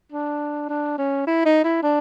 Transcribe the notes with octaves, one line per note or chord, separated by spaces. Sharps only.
D4
D4
C#4
E4
D#4
E4
D4